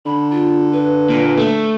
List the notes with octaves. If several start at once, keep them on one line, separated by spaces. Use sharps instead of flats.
D3 B5
F4
B4
A#2
A3